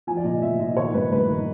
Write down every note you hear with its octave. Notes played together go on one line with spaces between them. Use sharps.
F3 G#5
D5
A#2 D#5
A#2 E5
A#2 D#5
D#3 C#5
G2 B4
G2 B4
D#3 A#4